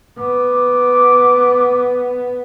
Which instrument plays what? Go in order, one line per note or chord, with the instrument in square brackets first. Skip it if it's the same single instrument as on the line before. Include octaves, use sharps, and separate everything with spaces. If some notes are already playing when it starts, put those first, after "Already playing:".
[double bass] B3 [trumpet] D6